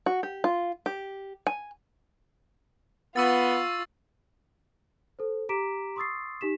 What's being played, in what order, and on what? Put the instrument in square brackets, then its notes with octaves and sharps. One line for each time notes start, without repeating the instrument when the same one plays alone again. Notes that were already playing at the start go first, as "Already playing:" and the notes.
[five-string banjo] F#4
G4
F4
G4
G#5
[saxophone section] B3 [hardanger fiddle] F4 [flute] F#5 [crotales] C#6 E6 A6
[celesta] A4 C5
G4 A#5 D6 B6 D7 E7
C6 C#6 D#6 E6 A6 C7
D#4 G4 B6 E7